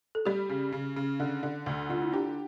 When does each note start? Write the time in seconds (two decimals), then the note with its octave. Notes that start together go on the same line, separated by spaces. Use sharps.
0.15 A4
0.26 G3 G4
0.49 C#3
0.72 C#3
0.96 C#3
1.20 D3
1.43 D3
1.66 D2
1.89 D3 F4
2.02 E4
2.12 D4 G4